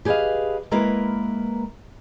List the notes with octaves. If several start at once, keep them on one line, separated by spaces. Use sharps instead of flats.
G4 G#4 B4 C#5 D#5 F5
G#3 A#3 E4 A#4 B4